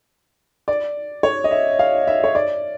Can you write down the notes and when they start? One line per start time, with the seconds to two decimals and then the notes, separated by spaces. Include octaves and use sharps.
0.68 D5
1.23 C#5
1.44 D#5
1.51 E5
1.79 F5
2.07 E5
2.24 C#5
2.35 D5